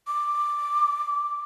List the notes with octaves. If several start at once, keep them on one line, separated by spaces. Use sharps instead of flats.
D6